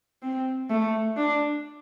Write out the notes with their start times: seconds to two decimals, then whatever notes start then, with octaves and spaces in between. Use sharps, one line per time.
0.23 C4
0.70 A3
1.17 D4